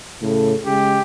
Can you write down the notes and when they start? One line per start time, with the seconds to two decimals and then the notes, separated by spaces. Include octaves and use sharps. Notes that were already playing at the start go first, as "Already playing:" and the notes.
0.22 A2 C#3 A4
0.66 C#3 G#3 G4